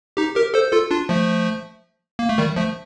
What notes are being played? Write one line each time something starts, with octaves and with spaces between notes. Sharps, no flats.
D#4 G4
G4 A#4
A4 C5
F4 A4
D4 F4
F3 A3
A#3
A3
D#3 G3
F3 A3